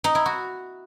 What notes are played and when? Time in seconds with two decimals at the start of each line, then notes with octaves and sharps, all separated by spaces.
0.04 D#4
0.15 E4
0.26 F#4